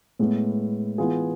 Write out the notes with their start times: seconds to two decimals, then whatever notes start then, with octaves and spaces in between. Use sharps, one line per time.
0.19 A2 G#3 B3
0.98 E3 B3 F4 G#4